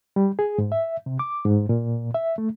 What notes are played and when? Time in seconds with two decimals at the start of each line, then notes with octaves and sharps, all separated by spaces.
0.16 G3
0.39 G#4
0.58 G#2
0.72 E5
1.06 C3
1.19 D6
1.45 G#2
1.69 A#2
2.15 E5
2.38 A3